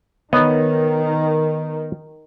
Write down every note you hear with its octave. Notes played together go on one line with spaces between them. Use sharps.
D#3 B3 C#5 D#5